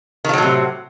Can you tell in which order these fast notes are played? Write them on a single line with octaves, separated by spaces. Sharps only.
D#3 F3 F#3 A2 C3